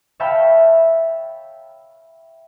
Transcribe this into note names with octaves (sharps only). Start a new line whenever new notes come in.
C#5 E5 F5 G5 A5 B5